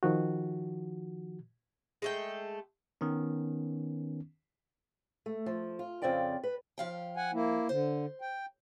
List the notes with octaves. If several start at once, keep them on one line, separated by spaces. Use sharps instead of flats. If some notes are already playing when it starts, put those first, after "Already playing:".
D#3 F3 F#4
G#3 A3 G5
D#3 B3 C#4
A3
F3
F4
F2 C#3 C4 F4 D5 G5
B4
F3 F5 G5
F#5 G#5
A#3 E4
D3 C5
G5